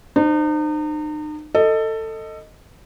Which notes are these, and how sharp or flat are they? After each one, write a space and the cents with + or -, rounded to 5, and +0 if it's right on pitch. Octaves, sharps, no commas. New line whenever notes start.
D#4 -40 C5 +0
A4 +20 D#5 +0